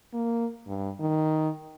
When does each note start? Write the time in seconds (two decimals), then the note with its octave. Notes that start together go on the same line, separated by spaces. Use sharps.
0.13 A#3
0.67 G2
1.00 D#3